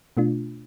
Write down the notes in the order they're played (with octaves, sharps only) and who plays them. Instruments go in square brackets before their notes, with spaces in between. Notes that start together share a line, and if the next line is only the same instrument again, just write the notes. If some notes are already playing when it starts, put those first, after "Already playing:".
[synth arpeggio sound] B2 A3 D4 F4